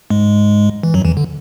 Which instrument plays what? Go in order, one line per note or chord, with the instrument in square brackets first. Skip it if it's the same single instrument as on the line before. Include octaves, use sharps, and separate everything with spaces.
[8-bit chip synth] G#2 G#3
E3
F#2 F#3
E2 E3
D3